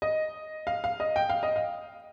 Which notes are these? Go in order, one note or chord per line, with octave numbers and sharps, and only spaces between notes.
D#5
F5
F5
D#5
G5
F5
D#5
F5